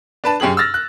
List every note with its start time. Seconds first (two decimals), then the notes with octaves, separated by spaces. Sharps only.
0.24 D4 B4 A5
0.40 F#2 C#4 G4 G#4 F#7
0.57 E6 F6 A6 A#6
0.74 F#6